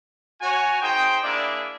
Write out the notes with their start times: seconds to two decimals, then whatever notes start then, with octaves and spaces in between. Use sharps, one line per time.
0.41 F#4 C#5 G#5
0.81 D#4 G#4 C5 G5
1.23 A#3 D4 E4 G#4 D5 E5